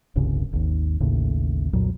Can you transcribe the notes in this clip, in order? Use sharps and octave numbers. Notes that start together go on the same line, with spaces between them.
E1 C2 G2 C#3
G#1 D#2
A1 D#2 A2 C#3
C2 F2 A#2 F#3